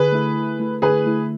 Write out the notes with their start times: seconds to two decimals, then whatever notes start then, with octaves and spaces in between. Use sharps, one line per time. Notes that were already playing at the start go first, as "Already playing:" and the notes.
Already playing: D3 G#4 B4
0.12 A3 E4
0.35 D3
0.60 A3 E4
0.82 D3 G#4 B4
1.06 A3 E4